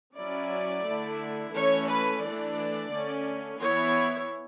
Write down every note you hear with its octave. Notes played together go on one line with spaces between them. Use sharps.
F#3 C#4 E4 D5
D3 A3 E4
E3 A3 C#4 C#5
B4
E3 A3 D4 D5
D3 A3 C#4
E3 B3 E4 C#5